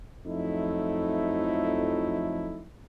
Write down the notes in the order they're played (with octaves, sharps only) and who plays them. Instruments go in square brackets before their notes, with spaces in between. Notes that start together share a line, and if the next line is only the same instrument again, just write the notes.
[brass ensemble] F2 F3 F#3 A3 D#4 E4